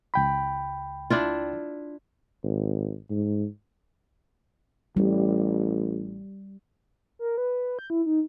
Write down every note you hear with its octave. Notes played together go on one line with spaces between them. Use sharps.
C#2 G5 B5
D4 E4 F4
G#1
G#2
A1 G3
A#4
B4
G6
E4
D#4